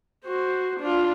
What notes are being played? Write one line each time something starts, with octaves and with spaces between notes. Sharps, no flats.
F#4 C5
D4 F4